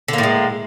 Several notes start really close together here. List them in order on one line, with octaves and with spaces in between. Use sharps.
D3 A#3 A2 G#3